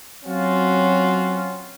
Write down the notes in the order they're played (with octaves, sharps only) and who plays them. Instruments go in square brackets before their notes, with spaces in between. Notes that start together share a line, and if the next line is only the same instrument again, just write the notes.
[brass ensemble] F#3 C4 C#4 F4 F#4